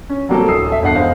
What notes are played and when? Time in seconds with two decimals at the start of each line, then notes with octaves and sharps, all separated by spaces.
0.10 C#4
0.29 F#3 G3 A#3 C4 A4 A#4
0.48 D1 D#6 E6 C7
0.69 A4 E5
0.82 E1 G2 D#5 F#5 C7
0.95 F1 G#3 C5 F5